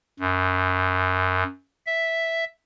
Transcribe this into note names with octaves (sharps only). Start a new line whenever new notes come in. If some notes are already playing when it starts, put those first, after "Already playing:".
F#2
E5